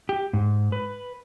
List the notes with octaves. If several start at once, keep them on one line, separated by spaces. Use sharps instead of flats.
G4
G#2
B4